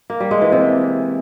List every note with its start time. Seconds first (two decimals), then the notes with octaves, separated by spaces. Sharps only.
0.10 A#3
0.20 G3
0.31 G#3
0.42 E3
0.52 C3